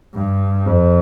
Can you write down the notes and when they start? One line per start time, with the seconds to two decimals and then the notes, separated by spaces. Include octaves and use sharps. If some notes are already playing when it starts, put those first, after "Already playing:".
0.15 G2
0.66 F2